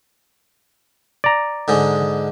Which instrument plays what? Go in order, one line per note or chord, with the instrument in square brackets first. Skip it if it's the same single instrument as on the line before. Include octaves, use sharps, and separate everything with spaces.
[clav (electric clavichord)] D5 A#5
[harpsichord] G#2 D3 G#3